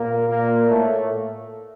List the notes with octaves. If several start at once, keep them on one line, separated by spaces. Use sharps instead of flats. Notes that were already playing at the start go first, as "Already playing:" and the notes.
Already playing: A#2 A#3
A#2 A#3
A2 A3